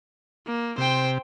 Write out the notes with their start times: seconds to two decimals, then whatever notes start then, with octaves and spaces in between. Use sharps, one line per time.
0.46 A#3
0.78 C3 C5 G5